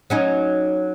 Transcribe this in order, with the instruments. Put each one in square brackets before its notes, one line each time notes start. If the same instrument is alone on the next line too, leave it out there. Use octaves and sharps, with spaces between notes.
[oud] F#3 C#4 D#4